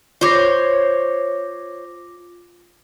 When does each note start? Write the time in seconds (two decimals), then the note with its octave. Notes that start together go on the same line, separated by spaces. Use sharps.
0.21 F4 C5 C#5 D6 A#6